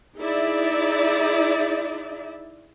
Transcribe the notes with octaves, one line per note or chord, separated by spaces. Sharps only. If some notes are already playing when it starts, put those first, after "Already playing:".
D#4 E4 G#4 D5 E5